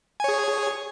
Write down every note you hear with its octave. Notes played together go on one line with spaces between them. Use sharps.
G#4 C#5 G#5